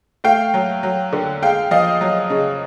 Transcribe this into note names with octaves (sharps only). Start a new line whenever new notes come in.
A3 F5 G5
F#3
F#3
D3
G#3 F5 G5
F3 D#5 F5
F#3
C#3